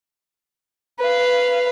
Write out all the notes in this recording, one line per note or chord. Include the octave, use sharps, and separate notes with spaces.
B4 F5